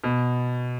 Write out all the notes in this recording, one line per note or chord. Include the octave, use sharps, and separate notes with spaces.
B2